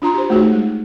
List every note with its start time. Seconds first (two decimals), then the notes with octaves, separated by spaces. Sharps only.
0.02 D4 F4 A#5 C6
0.14 G4 C5
0.30 A3 D#4 F#4 G#4 C#5
0.53 G#3